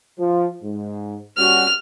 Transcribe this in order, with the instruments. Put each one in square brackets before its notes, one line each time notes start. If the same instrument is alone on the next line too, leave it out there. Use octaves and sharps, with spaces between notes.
[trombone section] F3
G#2
[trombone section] G3 C#4 F#4 [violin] F6